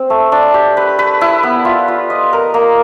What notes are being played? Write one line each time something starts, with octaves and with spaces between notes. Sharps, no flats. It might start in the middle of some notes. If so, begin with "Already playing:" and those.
Already playing: C4
A3
D4
G4
B4
B4
E4
B3
F4
F4
D#5
A#4
A#3